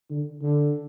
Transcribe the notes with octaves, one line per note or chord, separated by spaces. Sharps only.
D3
D3